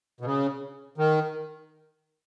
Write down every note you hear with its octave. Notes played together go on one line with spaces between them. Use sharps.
B2
C#3
D#3